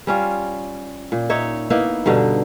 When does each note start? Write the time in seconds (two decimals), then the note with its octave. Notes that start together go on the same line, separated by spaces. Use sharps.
0.07 G3 C#4 F4
1.12 A#2
1.30 D#4 C#5 E5
1.70 A#3 B3 D#4 E4
2.06 G2 B2 D3 D#4